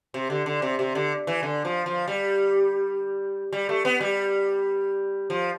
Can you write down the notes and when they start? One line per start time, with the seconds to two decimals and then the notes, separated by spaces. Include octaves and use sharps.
0.14 C3
0.30 D3
0.46 D3
0.62 C3
0.79 C3
0.95 D3
1.27 E3
1.43 D3
1.65 F3
1.86 F3
2.08 G3
3.53 G3
3.69 A3
3.85 B3
4.01 G3
5.30 F3